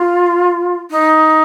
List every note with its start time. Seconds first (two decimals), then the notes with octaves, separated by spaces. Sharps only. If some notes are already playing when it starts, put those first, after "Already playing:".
Already playing: F4
0.90 D#4